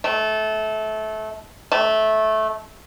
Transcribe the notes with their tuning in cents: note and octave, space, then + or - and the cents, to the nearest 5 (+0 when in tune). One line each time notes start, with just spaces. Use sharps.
A3 -20
A3 -15